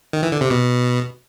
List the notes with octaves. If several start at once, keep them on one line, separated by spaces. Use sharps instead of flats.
D#3
E3
D3
C3
B2